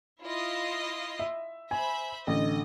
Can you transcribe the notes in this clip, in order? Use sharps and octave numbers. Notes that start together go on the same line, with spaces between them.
E4 F4 D#5
E5
C5 E5 G#5 B5
A1 D3 D#5